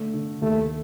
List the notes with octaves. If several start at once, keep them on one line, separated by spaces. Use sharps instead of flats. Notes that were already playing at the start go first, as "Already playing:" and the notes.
Already playing: D3 A3
D3
D#2 A3